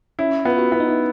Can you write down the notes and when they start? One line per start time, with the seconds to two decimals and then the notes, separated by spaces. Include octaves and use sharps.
0.19 C#4 E4
0.45 B3 F4
0.59 F#4
0.72 B3 E4
0.80 D#4
0.89 E4